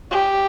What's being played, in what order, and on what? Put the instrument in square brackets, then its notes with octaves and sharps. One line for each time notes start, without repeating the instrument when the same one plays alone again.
[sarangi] G4